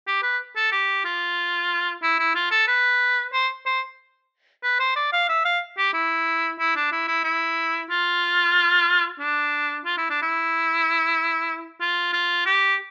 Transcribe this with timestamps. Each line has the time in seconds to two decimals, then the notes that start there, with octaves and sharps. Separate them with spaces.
0.07 G4
0.23 B4
0.56 A4
0.72 G4
1.04 F4
2.03 E4
2.19 E4
2.35 F4
2.51 A4
2.67 B4
3.33 C5
3.66 C5
4.63 B4
4.80 C5
4.96 D5
5.13 F5
5.29 E5
5.45 F5
5.77 G4
5.93 E4
6.59 E4
6.76 D4
6.92 E4
7.08 E4
7.24 E4
7.90 F4
9.20 D4
9.85 F4
9.97 E4
10.10 D4
10.22 E4
11.81 F4
12.13 F4
12.46 G4